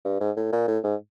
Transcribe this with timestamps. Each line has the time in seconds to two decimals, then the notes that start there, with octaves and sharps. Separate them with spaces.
0.05 G2
0.20 G#2
0.37 A2
0.52 A#2
0.68 A2
0.84 G#2